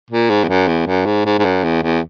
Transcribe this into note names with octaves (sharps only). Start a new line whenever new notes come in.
A#2
G#2
E2
F#2
E2
F#2
G#2
G#2
G#2
F#2
E2
E2